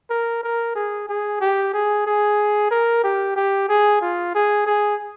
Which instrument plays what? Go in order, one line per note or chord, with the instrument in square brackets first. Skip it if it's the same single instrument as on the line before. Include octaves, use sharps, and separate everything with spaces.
[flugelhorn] A#4
A#4
G#4
G#4
G4
G#4
G#4
A#4
G4
G4
G#4
F4
G#4
G#4